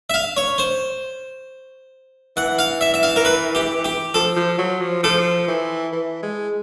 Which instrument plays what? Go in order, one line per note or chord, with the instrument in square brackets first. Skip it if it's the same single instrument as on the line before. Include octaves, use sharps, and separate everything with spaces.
[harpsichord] E5
F5
C#5
C5
[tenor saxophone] E3 [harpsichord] F#5
[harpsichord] F5
E5
E5
F5
A#4
B4
G4
G4
[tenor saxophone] F3 [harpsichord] A4
[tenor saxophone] F3
F#3
F3
[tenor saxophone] F3 [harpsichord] A4
[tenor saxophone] E3
E3
G#3